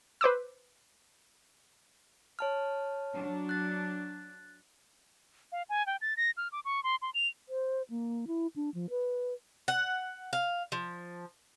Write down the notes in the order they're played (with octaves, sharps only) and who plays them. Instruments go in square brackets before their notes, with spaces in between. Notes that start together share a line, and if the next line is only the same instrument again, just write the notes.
[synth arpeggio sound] B4 C5 D6 E6
[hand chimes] C#5 A5 F6
[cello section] F#3 D4
[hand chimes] F#6 A6
[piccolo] F5
G#5
G5
A6
A#6
F6
D6
C#6
C6
C6
F7
[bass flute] C5
A#3
E4
D4
F3
B4
[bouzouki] F#5
F5
F3